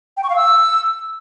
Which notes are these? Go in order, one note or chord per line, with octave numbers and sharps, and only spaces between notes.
G5
C#6
F5
E6